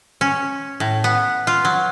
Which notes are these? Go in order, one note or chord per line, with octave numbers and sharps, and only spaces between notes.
C#4
A2
B3
F4
F#3